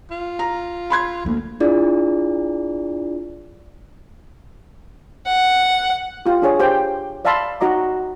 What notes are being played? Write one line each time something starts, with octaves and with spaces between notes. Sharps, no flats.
F4
A#5
B5 C6 G#6
D2 A3 A#3
D4 E4 F4 G#4 D5
F#5
F4 G4
D4 G#4 C#5
G4 C5 G5
D5 E5 F5 A5 B5 C6
D#4 F#4 D#5 A#5 D6